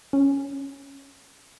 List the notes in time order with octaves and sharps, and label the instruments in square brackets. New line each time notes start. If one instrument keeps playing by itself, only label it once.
[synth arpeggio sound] C#4